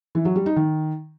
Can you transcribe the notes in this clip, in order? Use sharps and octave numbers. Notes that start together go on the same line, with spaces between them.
E3
F#3
G3
D#4
D#3